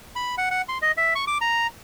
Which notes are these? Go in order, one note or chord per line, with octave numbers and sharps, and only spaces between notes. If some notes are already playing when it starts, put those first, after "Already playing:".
B5
F#5
F#5
C6
D#5
E5
C#6
D6
A#5